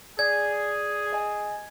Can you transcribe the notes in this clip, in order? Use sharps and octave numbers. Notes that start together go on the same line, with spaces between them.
G#4 D5 G#6
D#5 G#5